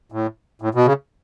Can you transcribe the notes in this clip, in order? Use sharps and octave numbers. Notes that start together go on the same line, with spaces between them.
A2
A2
B2
C#3